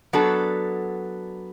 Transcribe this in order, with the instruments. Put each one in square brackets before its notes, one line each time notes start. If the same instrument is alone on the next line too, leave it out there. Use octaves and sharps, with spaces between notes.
[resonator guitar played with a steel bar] F#3 B3 D4 A4